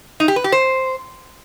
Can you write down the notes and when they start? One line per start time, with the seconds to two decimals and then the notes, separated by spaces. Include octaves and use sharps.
0.20 D#4
0.28 G4
0.36 B4
0.44 G4
0.52 C5